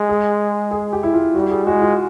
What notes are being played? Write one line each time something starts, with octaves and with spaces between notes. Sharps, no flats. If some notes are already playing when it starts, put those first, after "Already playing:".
Already playing: G#3
G#4
G#4
G4
E4
F4
G3 F#4
G#4
G#3 F#4
F4